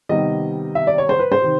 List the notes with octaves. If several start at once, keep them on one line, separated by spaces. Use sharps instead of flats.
C3 D#3 G3 B3 D#5
E5
D5
C#5
C5
B4
C5
C3 D#3